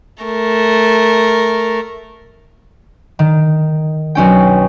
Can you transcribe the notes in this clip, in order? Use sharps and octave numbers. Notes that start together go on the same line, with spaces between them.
A3 A#4
D#3
B1 C#4 G5